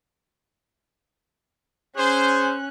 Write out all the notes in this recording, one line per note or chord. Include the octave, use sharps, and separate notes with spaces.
C#4 G#4 C5 F#6